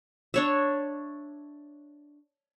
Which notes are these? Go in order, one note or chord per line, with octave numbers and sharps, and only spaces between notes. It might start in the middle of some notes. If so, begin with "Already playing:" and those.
D4 C#5 E5